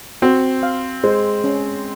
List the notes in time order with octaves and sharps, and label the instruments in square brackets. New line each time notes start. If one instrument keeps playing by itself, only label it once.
[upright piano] C4 [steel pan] F#4
[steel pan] F5
[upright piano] G#3 [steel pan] C5
[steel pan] C#4